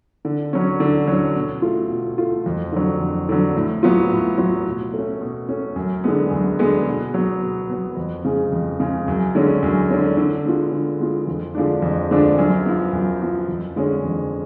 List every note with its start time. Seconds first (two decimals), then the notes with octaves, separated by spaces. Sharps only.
0.25 D3
0.53 F#3 C#4
0.80 D3
1.07 F#3 C#4
1.35 B2
1.62 A3 F4
1.90 B2
2.18 A3 F4
2.46 F2
2.72 D3 F#3
3.00 F2
3.29 D3 F#3
3.56 A2
3.83 F#3 B3 F4
4.11 A2
4.38 F#3 B3 F4
4.67 B2
4.94 A3 C#4
5.21 B2
5.49 A3 C#4
5.76 F#2
6.04 D3 G#3 B3
6.31 F#2
6.59 D3 G#3 B3
6.87 B2
7.14 F#3 B3
7.42 B2
7.70 F#3 B3
7.97 F2
8.25 C#3 G#3
8.52 F2
8.80 C#3 G#3
9.08 F#2
9.35 D3 G#3 C#4
9.63 F#2
9.90 D3 G#3 C#4
10.17 D3
10.45 G#3 B3 F4
10.72 D3
11.00 G#3 B3 F4
11.27 F2
11.55 D3 F3 G#3 D4
11.82 F2
12.11 D3 F3 G#3 D4
12.38 F#2
12.65 F3 B3
12.93 F#2
13.21 F3 B3
13.48 F2
13.76 D3 G#3 C#4
14.04 F2